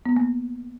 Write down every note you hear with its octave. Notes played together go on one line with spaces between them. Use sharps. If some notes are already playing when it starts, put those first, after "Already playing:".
B3
A#3